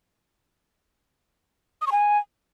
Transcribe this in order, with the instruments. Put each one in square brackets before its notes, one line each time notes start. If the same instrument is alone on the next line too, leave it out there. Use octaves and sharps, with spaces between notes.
[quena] D#6
C#6
G#5